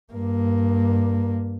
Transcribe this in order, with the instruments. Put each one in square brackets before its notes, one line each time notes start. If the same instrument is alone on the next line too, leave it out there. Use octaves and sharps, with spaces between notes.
[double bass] G2 A#3